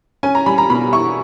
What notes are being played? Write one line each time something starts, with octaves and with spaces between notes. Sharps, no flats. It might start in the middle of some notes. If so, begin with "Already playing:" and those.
C#4 G#5
A#5
G3 B5
A#5
B2 B5
E4 C#6